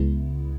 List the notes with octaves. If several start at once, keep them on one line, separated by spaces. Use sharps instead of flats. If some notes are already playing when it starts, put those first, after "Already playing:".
Already playing: C#2 C#3 G#3 B3 E4